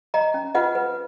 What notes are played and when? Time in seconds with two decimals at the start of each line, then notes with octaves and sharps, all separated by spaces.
0.14 D#5 A#5
0.34 C#4
0.54 F4 B4 D#5 F#5
0.75 B4